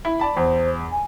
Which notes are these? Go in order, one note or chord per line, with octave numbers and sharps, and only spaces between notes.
E4
D5 A5 B5
E2 C5
G#5